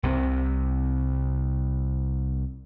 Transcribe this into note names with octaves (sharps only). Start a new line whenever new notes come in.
C2 C3 C4